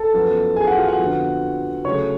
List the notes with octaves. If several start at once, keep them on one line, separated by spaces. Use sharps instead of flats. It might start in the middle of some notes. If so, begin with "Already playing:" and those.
Already playing: A4 A5
F#2 F3 B3
G#4 G#5
F#4 F#5
F4 F5
F#4 F#5
F2 D3 F3 B3
C#3 F#3 A3 C#5 C#6